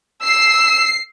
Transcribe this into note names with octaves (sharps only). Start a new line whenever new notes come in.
E6 C7